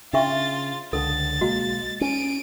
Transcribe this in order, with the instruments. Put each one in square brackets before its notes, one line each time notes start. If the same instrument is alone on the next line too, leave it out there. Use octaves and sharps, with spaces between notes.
[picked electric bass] C#3 [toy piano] D4 E5 C#6 [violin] F4 A6
[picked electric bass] C#2 D3 [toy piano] A4 [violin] A6
[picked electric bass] B1 G#3 A#3 [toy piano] F#4
[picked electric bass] C#4 [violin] D7 D#7